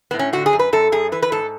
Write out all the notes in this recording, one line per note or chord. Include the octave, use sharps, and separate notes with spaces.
A2 B3
C#4
D3 F#4
G#4
F#2
B4
F#2 A4
F#2 G#4
E3 B4
B4
G#2 A4